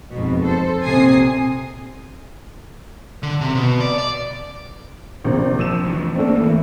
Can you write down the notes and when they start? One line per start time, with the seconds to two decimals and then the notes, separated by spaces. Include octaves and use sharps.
0.13 F2 G#2 B2
0.45 A4 C5
0.85 A#1 C3 G#5 D#6 C7
3.23 D3
3.41 C3
3.55 B2
3.80 D5
3.98 D5
5.24 A#1 C3
5.59 F3 E6 D#7 E7
5.84 D2 E3
6.16 A3 A#3 C4 D4 A4
6.40 E3